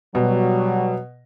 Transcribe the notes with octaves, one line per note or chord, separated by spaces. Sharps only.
B2 F#3 G3 F#4